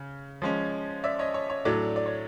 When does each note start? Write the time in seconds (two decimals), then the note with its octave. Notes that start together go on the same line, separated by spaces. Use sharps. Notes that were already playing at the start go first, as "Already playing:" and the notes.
Already playing: C#3
0.42 F3 G#3 C#4
1.04 D5 E5
1.19 C#5 D#5
1.34 C#5
1.50 C#5
1.65 A2 F#3 A3 D4 D5
1.96 D5
2.06 C#5